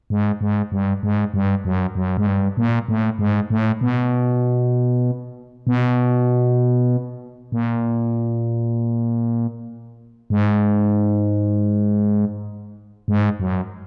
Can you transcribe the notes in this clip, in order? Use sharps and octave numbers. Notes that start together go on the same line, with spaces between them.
G#2
G#2
G2
G#2
G2
F#2
F#2
G#2
G2
A#2
A2
G#2
A2
B2
B2
A#2
G#2
G#2
F#2